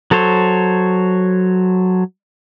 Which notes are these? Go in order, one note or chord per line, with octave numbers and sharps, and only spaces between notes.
F#3 A4 C5 C#5